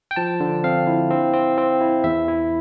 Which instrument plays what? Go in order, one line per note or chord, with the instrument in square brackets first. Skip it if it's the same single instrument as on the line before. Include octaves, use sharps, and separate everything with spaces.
[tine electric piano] G5
F3 A5
D3
C4 F5
E4
C4
C4
C4
E4
E2 E5
E4